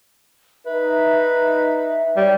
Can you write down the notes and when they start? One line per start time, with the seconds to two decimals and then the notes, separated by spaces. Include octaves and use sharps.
0.66 D#4 B4 E5
2.17 G3 C#5